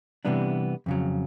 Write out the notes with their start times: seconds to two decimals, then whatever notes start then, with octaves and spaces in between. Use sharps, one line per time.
0.25 C3 E3 G3 B3 D4
0.86 F2 C#3 F#3